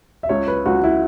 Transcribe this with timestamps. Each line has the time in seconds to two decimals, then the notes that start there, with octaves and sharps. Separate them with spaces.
0.23 E5
0.29 C#2 C#5
0.48 B4
0.66 C#2 F#4
0.84 E4